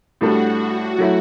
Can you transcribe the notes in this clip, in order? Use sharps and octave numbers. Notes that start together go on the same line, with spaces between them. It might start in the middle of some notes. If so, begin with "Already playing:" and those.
A2 G3 D4 F#4 A4
F#3 A3 E4